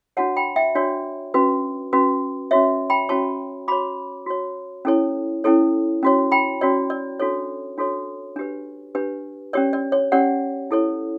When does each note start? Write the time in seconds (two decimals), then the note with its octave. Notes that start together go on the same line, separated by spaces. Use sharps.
0.17 D4 F#4 C#5 F#5 A5
0.36 G5 B5
0.56 E5 G5
0.75 D4 F#4 C#5 D5
1.34 C#4 F#4 B4
1.93 C#4 F#4 B4
2.51 C#4 F#4 C#5 E5
2.90 G5 B5
3.09 C#4 F#4 C#5 A5 C#6
3.68 F#4 C#5 B5 D6
4.26 F#4 C#5
4.85 C#4 E4 A4 C#5
5.44 C#4 E4 A4 C#5
6.03 C#4 F#4 C#5
6.32 G5 B5
6.61 C#4 F#4 C#5 D5
6.90 D5
7.20 D4 F#4 A4 C#5
7.78 D4 F#4 A4 C#5
8.36 D4 G4 B4
8.95 D4 G4 B4
9.53 C#4 G4 C#5 D5
9.73 D5
9.92 C#5
10.12 C#4 G4 C#5 D5 F#5
10.71 E4 A4 C#5